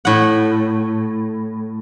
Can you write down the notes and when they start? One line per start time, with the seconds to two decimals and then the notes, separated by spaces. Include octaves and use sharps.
0.05 A2 F#5